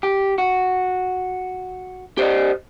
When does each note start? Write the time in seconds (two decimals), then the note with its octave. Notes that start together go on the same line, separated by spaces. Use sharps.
0.03 G4
0.38 F#4
2.17 G4 C5 D5 D#5